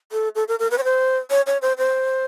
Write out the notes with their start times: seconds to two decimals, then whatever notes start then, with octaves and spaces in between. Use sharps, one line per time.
0.12 A4
0.35 A4
0.48 A#4
0.59 A#4
0.71 B4
0.78 C#5
0.84 C5
1.31 C#5
1.46 C#5
1.62 C5
1.78 C5